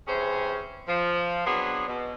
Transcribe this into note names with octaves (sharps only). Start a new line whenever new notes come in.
C3 E3 C#4 G#4 C5
F3
F#3 B3 C4 D4 G#4
B2